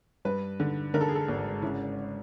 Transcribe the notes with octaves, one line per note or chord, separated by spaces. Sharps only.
G2 B4
D3
D3 A#4
A4
G#4
A4
G#1
C#3 E4